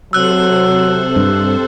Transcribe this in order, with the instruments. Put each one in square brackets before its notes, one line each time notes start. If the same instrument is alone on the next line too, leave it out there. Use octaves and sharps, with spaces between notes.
[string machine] C3 A4 C5 [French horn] F#3 [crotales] E6 F#6
[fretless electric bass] G2